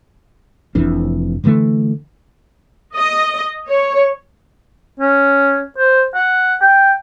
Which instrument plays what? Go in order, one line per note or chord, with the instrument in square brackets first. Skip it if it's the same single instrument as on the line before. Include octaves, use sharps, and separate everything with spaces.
[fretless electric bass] F1 F2 E3 D4
D3 E3 G#3 A3
[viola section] D#5
C#5
[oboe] C#4
C5
F#5
G5